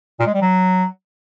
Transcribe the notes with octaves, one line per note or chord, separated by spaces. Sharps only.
A#2
G#3
G3
F#3